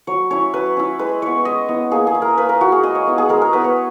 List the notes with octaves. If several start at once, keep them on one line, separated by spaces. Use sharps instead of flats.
F#3 C#5
C#4 E4 C#5
F#3 B4
C#4 E4
G#3 B4
B3 E4 C#5
G#3 D#5
B3 E4
A#3 G#4
G#4
E4
A#4
A#3 B4
A#4
E4 F#4
G#4
G#3 D#5
C#5
B3 E4
G#4
G#3 A#4
A#4
B3 E4 B4
C#5